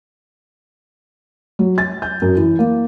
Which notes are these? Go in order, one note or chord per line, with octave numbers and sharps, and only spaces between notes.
F#3
A6
G6
F#2
E3
A#3